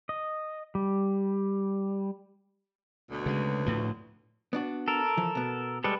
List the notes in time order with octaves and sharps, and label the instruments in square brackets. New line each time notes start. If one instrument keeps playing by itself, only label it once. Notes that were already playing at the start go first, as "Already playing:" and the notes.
[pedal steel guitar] D#5
G3
[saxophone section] D2 B2
[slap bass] C#3 G#3
A2 F3
[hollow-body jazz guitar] B3 D4 F#4
[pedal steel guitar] A4 A#4
[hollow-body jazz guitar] E3 F3
B2 B3
[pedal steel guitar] G3 G#3 A4 [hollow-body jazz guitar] B4